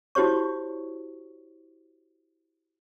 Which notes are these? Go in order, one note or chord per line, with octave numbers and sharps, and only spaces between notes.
E4 F#4 G4 C5 C#5 C#6